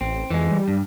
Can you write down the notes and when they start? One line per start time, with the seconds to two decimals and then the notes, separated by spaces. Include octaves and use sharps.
0.01 A1 C4
0.31 F2 E3 G#3
0.52 G3
0.68 G2